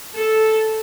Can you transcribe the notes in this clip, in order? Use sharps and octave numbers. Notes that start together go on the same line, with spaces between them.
A4